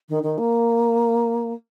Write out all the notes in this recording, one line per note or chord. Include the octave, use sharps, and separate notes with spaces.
D#3
D#3
A#3